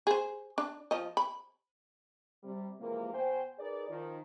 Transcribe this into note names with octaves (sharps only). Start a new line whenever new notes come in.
G#4 C5
D4
F3 D#5
B5
C3 G3
C3 E3 F3 G#3 A#3
B2 C5 G5 G#5
D#4 G#4 A#4 B4 D5
D#3 F3 D#4